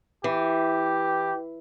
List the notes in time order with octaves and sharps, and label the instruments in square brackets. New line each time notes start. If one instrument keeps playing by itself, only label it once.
[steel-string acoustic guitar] E3 [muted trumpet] G4